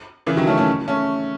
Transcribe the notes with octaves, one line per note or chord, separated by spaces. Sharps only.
C#3 E3
D#3 F#3
A3 C#4
A3 C#4
A3 C#4